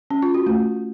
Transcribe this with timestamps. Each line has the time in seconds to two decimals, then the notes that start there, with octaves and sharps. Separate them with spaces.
0.11 C#4
0.22 F4
0.34 F#4
0.46 A3